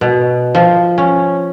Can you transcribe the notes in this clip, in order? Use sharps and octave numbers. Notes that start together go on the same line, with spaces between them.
B2
F3
C#4